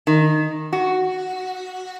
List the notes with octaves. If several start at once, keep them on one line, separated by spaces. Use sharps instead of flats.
D#3
F#4